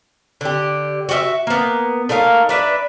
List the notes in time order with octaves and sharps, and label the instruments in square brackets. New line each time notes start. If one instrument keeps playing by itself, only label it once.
[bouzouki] D3 G4
F#4 G4 E5
A#3 B3
A3 D#4 A#4 F5
D4 B4 E5